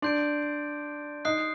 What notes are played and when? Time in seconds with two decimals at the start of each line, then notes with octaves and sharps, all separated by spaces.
0.02 D4 C6 G6 D7
1.25 D#4 D#6 F#6 C7